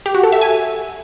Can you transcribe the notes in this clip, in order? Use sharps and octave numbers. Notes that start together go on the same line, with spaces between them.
G4
F#4
A4
E5
G#5